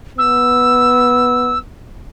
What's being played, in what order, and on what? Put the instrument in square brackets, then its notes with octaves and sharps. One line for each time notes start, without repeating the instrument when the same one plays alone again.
[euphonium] B3 [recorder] E6